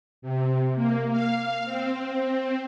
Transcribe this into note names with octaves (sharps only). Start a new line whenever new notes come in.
C3
A#3
F5
C4